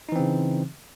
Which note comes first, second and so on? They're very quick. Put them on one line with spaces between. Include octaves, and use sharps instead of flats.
D#4 E3 C4 C#3